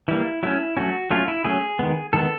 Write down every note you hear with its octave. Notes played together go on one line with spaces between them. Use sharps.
E3 G3 A#3 E4
F#3 A3 C#4 E4
F#3 A3 C#4 F#4
F#3 A3 C#4 F4
E4
F#3 A3 C#4 G#4
D#3 G#3 B3
D#3 G#3 B3 A4